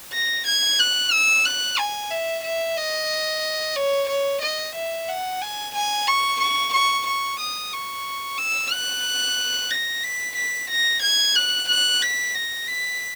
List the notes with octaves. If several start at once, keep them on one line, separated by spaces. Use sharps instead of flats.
A#6
G#6
F#6
E6
F#6
G#5
E5
E5
D#5
C#5
C#5
D#5
E5
F#5
G#5
G#5
C#6
C#6
C#6
C#6
D#6
C#6
E6
F#6
A#6
B6
B6
A#6
G#6
F#6
F#6
B6
A#6
B6